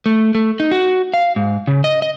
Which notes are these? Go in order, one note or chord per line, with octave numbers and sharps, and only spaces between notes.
A3
A3
D#4
F#4
F5
G#2
C#3
D#5
D#5